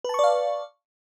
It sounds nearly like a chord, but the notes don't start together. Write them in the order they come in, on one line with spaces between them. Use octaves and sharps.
B4 A5 C#6 D5 F5